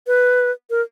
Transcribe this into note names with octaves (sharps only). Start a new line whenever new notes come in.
B4
A#4